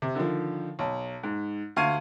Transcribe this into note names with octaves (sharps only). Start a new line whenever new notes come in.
C3
D3 D#3 F3
B1
G#2
D2 F5 C#6 G#6 D#7